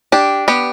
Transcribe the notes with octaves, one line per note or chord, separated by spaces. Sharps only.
D4 G4
B3 G4